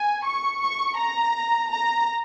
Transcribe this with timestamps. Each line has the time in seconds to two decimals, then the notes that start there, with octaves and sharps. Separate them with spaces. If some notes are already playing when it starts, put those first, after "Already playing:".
Already playing: G#5
0.25 C#6
0.61 C#6
0.97 A#5
1.70 A#5